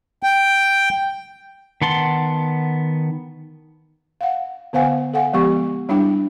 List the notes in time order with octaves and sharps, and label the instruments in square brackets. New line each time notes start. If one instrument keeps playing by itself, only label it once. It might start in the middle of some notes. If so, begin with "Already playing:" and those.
[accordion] G5
[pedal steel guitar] D#3 B3 F#5 A5 C6
[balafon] F5 F#5
D3 B3 C5 F5 F#5 G#5
A4 F5 F#5 G#5
F3 G#3 B3 G4 C#6
G3 D4 E4 G5